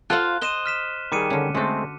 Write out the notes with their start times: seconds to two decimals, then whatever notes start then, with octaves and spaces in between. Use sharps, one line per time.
0.10 F4 A4 C5 F5 F#5 F#6
0.41 C5 D#5 D#7 E7 G7
0.66 F6 B6 E7
1.12 D#3 G3 G#4 D6 C#7 D#7
1.30 D3 C#4
1.55 G#3 A3 C4 F#4 A4